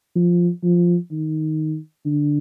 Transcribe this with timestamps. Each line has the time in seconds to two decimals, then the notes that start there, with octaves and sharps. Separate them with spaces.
0.16 F3
0.63 F3
1.11 D#3
2.06 D3